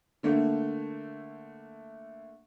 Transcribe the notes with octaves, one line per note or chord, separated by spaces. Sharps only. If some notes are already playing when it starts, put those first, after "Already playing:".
D3 A3 A#3